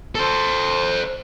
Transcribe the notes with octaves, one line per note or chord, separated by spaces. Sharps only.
A4 C5